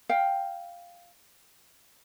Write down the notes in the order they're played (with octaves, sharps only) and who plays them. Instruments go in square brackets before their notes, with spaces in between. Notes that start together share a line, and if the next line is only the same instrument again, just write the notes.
[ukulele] F5 G5